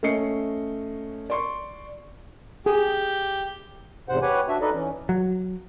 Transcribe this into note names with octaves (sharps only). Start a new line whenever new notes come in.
A3 C#4 D#5 C7 C#7
D5 C6 C#6
G4 G#4
E2 G#2 C3 C5 F#5
G4 B4 C#5 F#5 G#5
D4 F#4 E5
D#4 A4 B4 D5 D#5
E3 C#4
F#3